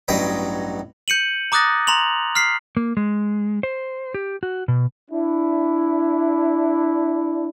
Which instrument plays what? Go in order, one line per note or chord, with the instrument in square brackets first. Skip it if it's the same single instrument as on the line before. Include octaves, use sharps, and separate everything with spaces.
[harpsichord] A1 G2 F#3 D#5 G5 B5
[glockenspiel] G6 C#7 D#7 F#7
A#5 D6 D#6 F#6 A6 A#6
A#5 C6 F7 F#7
F6 B6 C7
[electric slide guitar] A#3
G#3
C5
G4
F#4
B2
[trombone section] D4 E4